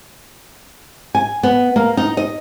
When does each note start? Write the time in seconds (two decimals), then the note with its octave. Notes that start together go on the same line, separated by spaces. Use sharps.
1.15 G#5
1.43 B3
1.76 A#3
1.97 D#4
2.17 D#5